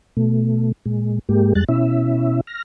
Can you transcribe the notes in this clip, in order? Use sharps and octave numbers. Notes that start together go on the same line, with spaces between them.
B2 A3
A#2 G#3
G#2 G#3 A#3 G4
F2 G3 G#3 F#6 A6
B2 C#4 E4 E5
F6 A#6